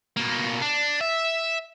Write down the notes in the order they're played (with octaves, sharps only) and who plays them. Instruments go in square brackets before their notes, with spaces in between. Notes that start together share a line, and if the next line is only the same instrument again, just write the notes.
[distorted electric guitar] B2 A#3
D4
E5